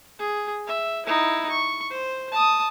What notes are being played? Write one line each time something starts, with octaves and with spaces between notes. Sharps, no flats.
G#4
E5
D#4 E4
C#6
C5
A5 D#6